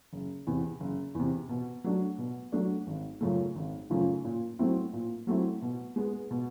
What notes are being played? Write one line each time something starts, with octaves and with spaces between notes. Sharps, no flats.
F#1
E2 C3
F#1
E2 C3
B2
F#3 A3 D4
B2
F#3 A3 D4
G#1
F#2 C#3 F3 A3
G#1
F#2 C#3 F3 A3
A#2
F#3 A3 C4 E4
A#2
F#3 A3 C4 E4
B2
G#3 B3
B2